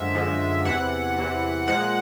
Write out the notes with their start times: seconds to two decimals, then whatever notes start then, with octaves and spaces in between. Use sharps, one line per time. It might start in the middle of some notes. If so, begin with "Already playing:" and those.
Already playing: F#2 D3 F3 G#3 E5
0.14 F#2 D3 F3 G#3
0.65 E2 C3 E3 F#5
1.16 E2 C3 E3
1.68 A#2 F3 G#3 F#5